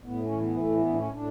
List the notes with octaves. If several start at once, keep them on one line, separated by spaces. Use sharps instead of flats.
A2 B3
C#4
E3
B3
A2 A3
B3
A2 D4
C#4
A2 D4